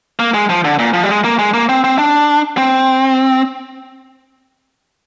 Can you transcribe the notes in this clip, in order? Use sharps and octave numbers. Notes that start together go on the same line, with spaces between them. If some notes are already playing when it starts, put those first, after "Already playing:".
A#3
G#3
F3
D3
A#2
F3
G3
G#3
A#3
G#3
A#3
C4
C4
D4
C4